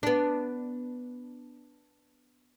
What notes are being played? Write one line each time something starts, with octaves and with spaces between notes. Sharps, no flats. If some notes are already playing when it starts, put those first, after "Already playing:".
B3 D4